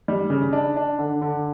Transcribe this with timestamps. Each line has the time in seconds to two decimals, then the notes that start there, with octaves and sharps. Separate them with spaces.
0.08 G3
0.30 C#3
0.53 D4
0.77 D4
0.99 D3
1.22 D3